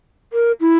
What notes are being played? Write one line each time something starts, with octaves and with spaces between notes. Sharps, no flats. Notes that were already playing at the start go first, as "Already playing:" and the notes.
A#4
E4